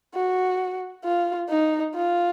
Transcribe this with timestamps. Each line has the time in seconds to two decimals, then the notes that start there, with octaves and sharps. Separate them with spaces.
0.14 F#4
1.04 F4
1.49 D#4
1.95 F4